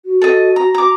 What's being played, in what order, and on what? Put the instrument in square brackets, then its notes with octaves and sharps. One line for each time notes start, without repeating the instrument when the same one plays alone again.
[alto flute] F#4
[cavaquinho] A4 D#5
A#5
A#5 D6